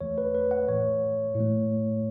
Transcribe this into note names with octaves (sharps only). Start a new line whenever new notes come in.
E2 E3 A3 C#5
B4
B4
F#5
A2 E3 A3 C#5
A2
A3